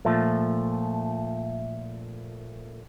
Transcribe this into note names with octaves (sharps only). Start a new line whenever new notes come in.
A#2 F3 A3